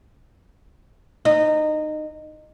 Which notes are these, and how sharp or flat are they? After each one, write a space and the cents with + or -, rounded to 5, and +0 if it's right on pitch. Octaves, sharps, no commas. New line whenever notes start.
D#4 -20